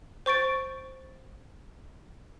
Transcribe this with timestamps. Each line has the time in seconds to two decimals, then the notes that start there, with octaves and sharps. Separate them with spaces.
0.26 C5 C#6 A6 D7